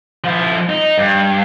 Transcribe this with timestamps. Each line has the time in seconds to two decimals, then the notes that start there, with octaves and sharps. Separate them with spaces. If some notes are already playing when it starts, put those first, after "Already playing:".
0.24 F3 E4
0.69 D#4
0.98 G2